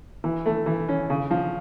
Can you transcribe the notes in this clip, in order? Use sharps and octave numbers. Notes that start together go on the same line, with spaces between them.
E3
A3
E3
C#4
C#3
F3